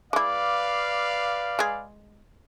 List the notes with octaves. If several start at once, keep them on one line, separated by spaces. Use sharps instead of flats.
G#3 E4 B4 D5 F5 D6
G#3 G#4